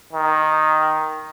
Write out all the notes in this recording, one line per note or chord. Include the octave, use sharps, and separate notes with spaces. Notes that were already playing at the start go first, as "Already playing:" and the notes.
D#3